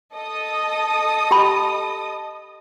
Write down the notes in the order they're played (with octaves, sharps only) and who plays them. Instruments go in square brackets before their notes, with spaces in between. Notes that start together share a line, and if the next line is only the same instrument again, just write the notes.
[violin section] A4 D#5 D#6
[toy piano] G4 G5 B5